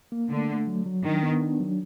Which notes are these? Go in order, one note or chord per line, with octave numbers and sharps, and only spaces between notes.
A#3
D3 A3
A3
F#3
F#3
D#3 D4
B3
D4
F#3